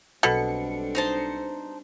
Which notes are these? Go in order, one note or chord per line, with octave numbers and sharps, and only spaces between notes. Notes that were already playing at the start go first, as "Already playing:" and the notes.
B1 B2 G3 C4 D4 A4 C#7
D#4 C5 A5